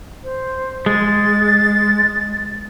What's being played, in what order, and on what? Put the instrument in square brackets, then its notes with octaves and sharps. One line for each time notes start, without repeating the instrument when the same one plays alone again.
[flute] C5
[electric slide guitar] G#3 [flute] A6